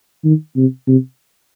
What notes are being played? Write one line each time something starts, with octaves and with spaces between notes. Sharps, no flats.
D#3
C3
C3